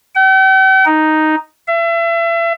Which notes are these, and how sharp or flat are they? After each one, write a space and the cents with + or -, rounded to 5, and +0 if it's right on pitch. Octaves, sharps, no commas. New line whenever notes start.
G5 -45
D#4 +0
E5 +35